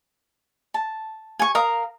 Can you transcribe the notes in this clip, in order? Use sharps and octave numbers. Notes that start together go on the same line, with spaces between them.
A5
G#5 C#6
A#4 F5 A#5 D#6